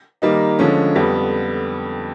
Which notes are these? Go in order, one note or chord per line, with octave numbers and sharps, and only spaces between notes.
D#3 G3 A#3 D#4
D3 F3 G#3 C#4
F2 D3 G3 B3